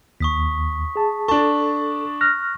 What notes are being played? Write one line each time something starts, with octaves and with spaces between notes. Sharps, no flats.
D#2 C#6 D#6 B6
G#4 A5
D4 A4 A5 C#6
F6 F#6 A#6